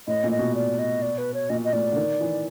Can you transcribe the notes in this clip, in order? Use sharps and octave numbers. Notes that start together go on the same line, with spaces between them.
A2 D#5
A#2
D#5
B2
D5
D#5
D5
B4
C#5
A#2 D#5
D#5
A2 D5
D3
D#3
E3